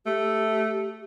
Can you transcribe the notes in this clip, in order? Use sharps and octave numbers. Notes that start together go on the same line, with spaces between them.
A3 G4